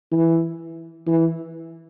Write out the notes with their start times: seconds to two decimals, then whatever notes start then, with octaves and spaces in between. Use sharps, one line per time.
0.11 E3
1.07 E3